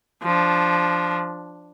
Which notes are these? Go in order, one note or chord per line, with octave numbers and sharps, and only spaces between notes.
F3 D4